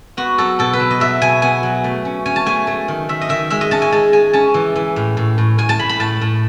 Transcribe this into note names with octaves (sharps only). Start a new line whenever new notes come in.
B3 F#4
F#3 A4
B2 A4
B4
F#3
D#5
F#3 E5
B2 G#5
B3 G#5
F#3
A3
C#4
C#4 G#5
A5
A3 G#5
A3
D#3
D#3 E5
D#5
D#3 E5
G#3 E5
D#5
C#4 A5
G#5
G#3 A5
G#3 G#5
C#4 A5
E3
E3
A2
A2
A2
A2 G#5
A5
A2 B5
B5
A2 A5
A2